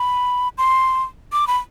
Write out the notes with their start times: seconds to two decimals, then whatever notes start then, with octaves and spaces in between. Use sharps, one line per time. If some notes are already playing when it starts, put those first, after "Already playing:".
Already playing: B5
0.58 C6
1.32 D6
1.47 B5